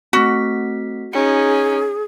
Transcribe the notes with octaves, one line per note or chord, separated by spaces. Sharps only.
A3 C4 F#4 B6
C#4 D#4 G#4 C#7